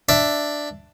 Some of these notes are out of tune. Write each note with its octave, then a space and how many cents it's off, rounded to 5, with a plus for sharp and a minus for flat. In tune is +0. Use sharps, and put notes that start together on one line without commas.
D4 +5 E5 +10